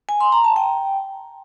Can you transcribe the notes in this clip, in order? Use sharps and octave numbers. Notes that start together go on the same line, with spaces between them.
G#5
C6
A#5
A5
G5